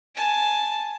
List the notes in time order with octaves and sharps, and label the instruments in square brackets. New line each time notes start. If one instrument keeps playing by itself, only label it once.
[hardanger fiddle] G#5 A5